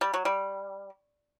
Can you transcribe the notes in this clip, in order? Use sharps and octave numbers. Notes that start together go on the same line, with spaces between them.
G3
F#3
G3